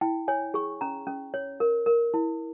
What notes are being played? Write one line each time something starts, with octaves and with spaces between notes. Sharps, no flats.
E4 G5
C#5 G#5
G#4 C#6
C#4 A#5
C#4
C#5
A#4
A#4
E4